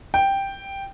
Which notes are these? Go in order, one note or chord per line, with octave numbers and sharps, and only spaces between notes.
G5